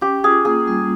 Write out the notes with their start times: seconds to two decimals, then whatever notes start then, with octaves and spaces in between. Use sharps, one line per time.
0.01 C#4 G4
0.24 F4 G#4
0.45 A#3 G#4
0.68 G3